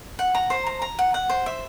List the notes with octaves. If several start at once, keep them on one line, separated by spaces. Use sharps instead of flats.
F#5
A#5
C5
A#5
A#5
F#5
F#5
C5
E5